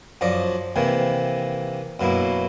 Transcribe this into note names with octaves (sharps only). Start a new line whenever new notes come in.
F#2 F3 D5 D#5
C3 D#3 E3 A#3
F#2 B2 A#3 E4